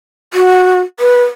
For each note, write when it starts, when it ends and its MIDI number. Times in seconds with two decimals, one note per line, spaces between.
0.34 0.81 66
1.00 1.23 71